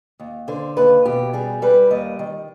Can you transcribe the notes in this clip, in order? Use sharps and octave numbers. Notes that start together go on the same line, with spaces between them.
D#2
D3 C5
D#2 B4
B2 G4
G3 G#4
G3 B4
D#2 D#5
D#3